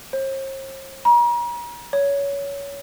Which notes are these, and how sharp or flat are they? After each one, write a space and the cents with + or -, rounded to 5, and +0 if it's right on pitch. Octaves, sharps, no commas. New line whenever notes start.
C5 +45
A#5 +40
C#5 +20